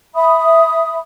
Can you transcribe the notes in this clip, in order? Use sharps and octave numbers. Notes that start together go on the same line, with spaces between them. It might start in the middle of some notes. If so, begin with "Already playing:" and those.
E5 B5 D#6